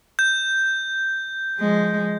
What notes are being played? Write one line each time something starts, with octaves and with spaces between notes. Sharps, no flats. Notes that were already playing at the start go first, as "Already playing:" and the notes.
G6
F3 G#3